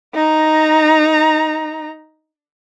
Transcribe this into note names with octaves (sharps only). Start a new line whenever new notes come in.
D#4 A#5